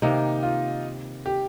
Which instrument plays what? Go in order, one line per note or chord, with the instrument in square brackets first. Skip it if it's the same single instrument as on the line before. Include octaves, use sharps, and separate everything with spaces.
[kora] C3 D#3 A#3 [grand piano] D#4
[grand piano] F4
G4